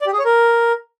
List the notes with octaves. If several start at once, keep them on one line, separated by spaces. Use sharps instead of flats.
D5
G4
G#4
C#5
A#4